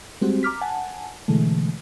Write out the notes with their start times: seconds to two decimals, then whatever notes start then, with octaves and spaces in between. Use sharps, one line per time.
0.21 G3 G#3 C4 F#4 G4
0.43 A#5 D6 F6 B6
0.61 F#5 G#5 A5
1.28 B2 D3 E3 G#3 A3